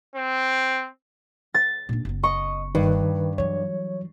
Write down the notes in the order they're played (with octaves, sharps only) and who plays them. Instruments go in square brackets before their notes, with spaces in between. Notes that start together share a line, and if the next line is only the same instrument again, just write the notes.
[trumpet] C4
[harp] A6
[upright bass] A#2 D4
F#1 B3
[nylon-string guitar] D#5 [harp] C#6
[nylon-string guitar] G2 [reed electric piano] D#3 B4
[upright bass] E3 F#3 [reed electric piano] C#5